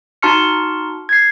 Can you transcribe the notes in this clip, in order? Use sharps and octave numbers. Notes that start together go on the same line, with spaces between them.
D#4 F#4 A5 C6 F6 C#7
G#6 C7